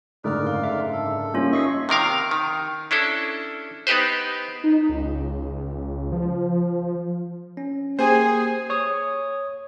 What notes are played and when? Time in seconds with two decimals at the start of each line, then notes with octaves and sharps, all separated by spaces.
0.24 F#1 G#2 D3 A3 A#4 D5 F6
0.47 F5
0.64 E5
0.92 A4
1.34 G3 A#3 C#4 F4 C#5
1.52 D#4 D#5 E5 C#6 C7
1.89 C3 D#3 A#4 F5
2.31 D#3
2.91 C#4 D4 E4 A4
3.87 B3 D#4 G4 B4 C5
4.64 D#4
4.89 C#2
6.12 F3
7.57 C#4
7.99 A#3 G4 G#4 C5 G#5
8.70 C#5 D#6